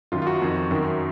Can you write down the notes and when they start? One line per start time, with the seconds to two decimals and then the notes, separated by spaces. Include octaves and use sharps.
0.12 F#2 D#3 F4
0.22 F4
0.27 F#4
0.42 F2 D#3
0.71 F#2 D#3